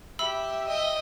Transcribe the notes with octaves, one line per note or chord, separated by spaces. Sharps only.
G4 E5 B5 E6
D#5 G5